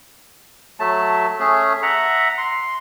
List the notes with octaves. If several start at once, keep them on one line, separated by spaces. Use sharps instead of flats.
F#3 A3 A5
A3 C#4 G#4
E5 F#5 A#5
C6